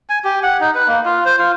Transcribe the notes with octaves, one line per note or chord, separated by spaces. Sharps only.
G#5
G4
F#5
D#4
B4
A#3
F4
C5
F4